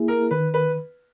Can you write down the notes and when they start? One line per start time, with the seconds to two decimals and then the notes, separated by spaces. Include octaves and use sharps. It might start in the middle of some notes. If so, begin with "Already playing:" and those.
Already playing: A#3 E4 G#4
0.08 A#4
0.31 D#3 B4
0.54 B4